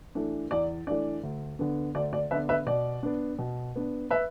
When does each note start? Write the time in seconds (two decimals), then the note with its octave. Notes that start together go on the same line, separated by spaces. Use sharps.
0.15 E3 A3 D4
0.51 E2 D5
0.87 E3 A3 D4 D5
1.23 D2
1.59 D3 B3 D4
1.95 D2 D5
2.13 D5
2.31 D3 B3 D4 B4 E5
2.49 B4 E5
2.67 B2 D5
3.03 B3 D4
3.39 B2
3.76 B3 D4
4.11 B4 E5